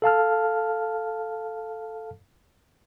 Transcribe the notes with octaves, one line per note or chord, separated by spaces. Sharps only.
A4 F5 A5 F6